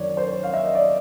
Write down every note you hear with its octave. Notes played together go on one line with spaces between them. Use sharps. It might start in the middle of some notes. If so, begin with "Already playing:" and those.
Already playing: F#2 D#3 C#5 D5
C5
C#5
F5
E5
D#5
D5